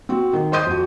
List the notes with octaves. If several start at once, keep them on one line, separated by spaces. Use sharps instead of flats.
C4 F#4
D#3
C5 D#5 C6 D#6 G6 D#7
F2 F#4